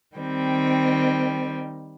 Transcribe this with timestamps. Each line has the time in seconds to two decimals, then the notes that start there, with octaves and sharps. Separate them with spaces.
0.16 D#3 G3 C4